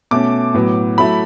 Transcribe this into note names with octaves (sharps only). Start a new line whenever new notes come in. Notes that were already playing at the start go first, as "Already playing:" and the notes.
B2 A3 C#4 D6
A2 F#3 B3
F#3 A3 E4 B5